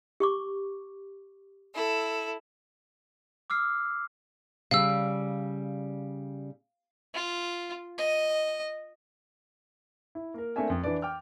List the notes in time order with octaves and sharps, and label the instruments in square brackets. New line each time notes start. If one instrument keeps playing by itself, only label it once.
[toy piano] G4 C#6 D6
[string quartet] E4 A4
[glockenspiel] D6 E6 F6 C7
[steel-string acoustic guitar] C#3 G3 [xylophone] F5 E6
[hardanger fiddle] F4
D#5
[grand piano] E4
A#3 A#4
A3 A#3 C4 D4 E5 G#5
F2
E3 D4 B4 D5
G5 D6 F6